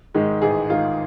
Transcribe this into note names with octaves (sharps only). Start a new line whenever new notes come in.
G#2 D#3 G#3
A1 G#4
G#2 D#3 G#3 F4